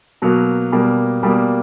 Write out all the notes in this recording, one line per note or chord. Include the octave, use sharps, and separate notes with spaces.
B2 F#3 A#3
B2 G3 A#3
B2 G3 A#3